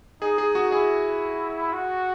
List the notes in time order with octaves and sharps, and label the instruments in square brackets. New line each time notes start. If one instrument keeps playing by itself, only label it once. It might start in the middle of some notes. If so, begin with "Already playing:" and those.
[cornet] D#4 [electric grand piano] G#4
[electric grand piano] G#4
F#4
[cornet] E4 [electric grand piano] G#4
[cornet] F#4